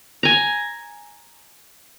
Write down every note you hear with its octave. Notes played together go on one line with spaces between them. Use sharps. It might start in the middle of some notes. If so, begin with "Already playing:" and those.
G#5 A#5